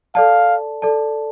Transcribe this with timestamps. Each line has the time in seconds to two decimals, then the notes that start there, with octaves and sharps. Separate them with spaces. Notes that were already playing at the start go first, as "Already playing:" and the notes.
0.15 A4 D5 F5 A5
0.82 A4 D5 A5